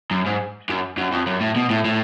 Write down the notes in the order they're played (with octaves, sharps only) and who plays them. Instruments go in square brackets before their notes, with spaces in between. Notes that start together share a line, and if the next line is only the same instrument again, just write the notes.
[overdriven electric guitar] F#2
G#2
F#2
F#2
F2
F#2
A2
B2
A2
A2